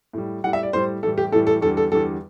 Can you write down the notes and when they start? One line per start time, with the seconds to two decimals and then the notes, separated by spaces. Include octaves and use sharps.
0.13 A2 G3
0.44 A2 G3 F#5
0.53 E5
0.63 D5
0.73 A2 G3 C5
1.03 A2 E3 G3 A4
1.18 G4
1.32 A2 E3 G3 A4
1.47 A4
1.61 E2 D3 G3 A4
1.77 A4
1.92 E2 D3 G3 A4